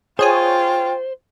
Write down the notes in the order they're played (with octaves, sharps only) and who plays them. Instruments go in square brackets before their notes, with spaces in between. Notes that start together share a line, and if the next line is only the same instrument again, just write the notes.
[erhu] F4 [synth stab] G#4 C#5 G#5 [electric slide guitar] C5 [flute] G5